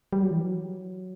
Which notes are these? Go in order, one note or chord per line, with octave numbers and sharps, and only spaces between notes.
G3
F#3
E3
F#3